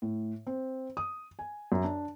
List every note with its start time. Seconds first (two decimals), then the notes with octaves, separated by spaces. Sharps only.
0.02 A2
0.47 C4
0.97 D#6
1.39 G#5
1.72 F#2
1.84 D4